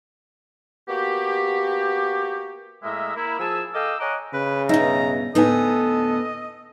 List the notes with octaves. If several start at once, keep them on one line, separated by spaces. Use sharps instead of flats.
A#3 B3 F#4 G4
A2 G#3 A#3 D#5 E5
A#3 E4
F3 G#4 A5 E6
A4 D#5 F5 G5 D6 E6
C#5 D#5 F#5 G#5 A#5 D6
C#3 B4
G2 B2 D#4 E5 A#5
D2 A2 B3 D#4 A4 D#5 G#5